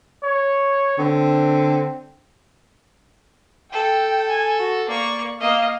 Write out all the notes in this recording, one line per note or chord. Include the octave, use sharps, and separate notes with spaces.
C#5
D3 C4
A4 G5
G#5
F#4
A#3 D5 C#6
A#3 D#5 F5